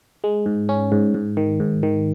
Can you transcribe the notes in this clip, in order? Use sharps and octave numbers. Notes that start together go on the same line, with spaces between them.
G#3
G#2
C#4
G#2
G#2
D#3
G#2
D#3